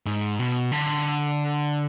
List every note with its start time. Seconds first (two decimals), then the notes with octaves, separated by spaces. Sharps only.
0.06 G#2
0.39 B2
0.72 D3